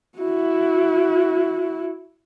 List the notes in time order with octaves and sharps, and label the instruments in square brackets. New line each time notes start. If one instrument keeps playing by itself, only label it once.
[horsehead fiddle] E4 F#4